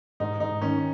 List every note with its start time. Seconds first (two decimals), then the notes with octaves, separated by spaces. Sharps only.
0.20 G#2 D#4
0.40 G#2 D#4
0.61 D#3 C#4